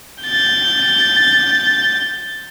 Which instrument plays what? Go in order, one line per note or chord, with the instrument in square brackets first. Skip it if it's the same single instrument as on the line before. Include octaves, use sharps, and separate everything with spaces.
[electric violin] G6 A6